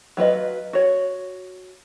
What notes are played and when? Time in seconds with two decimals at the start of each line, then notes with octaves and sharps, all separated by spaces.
0.17 F#3 F4 B4 D#5
0.73 F#4 C#5